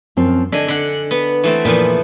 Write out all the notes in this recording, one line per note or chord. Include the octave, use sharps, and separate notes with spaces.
F#2 F3 C4
D3 D4 D#5 G#5
D3 F#5
B3
E3 A3 C4
A#2 E3 F3 B3